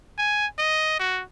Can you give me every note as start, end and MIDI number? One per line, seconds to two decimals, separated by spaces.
0.18 0.46 80
0.59 0.98 75
0.99 1.22 66